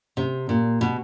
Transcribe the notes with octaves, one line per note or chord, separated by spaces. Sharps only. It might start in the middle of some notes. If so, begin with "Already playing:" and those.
C3
A#2
B2